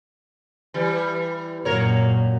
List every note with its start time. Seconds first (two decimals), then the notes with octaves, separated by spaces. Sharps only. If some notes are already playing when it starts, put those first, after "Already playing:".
0.74 E3 G3
1.65 F#2 A#2 A#3 A#4 C#5